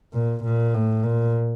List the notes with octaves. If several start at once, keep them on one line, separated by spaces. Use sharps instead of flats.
A#2
A#2
A2
A#2